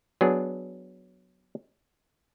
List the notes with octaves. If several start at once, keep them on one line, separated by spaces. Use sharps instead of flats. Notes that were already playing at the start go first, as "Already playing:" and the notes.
F#3 B3 D4 G#4